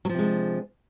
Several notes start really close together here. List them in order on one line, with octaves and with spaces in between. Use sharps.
F#3 F3 C3 G#3 D4